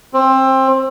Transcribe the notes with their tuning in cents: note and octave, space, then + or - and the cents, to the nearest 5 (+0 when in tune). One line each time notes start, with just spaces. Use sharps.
C4 +20